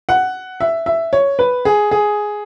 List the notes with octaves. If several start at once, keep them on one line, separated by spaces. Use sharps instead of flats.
F#5
E5
E5
C#5
B4
G#4
G#4